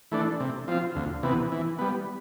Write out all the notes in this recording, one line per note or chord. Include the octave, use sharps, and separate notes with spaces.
E3 A3 D4
C3
F3 C4 F4
D2
C3 E3 B3
E3
G3 B3